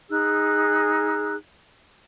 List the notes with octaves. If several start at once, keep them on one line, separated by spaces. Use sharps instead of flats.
D#4 G#4 E6 F#6